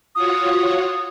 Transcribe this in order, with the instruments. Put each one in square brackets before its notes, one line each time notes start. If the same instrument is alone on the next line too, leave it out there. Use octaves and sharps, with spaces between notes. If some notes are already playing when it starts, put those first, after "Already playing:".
[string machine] F4 F#4 C#5 [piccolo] D#6